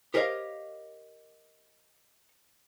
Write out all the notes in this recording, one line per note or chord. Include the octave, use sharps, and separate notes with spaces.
G4 A#4 C5 C#5 D#5 F5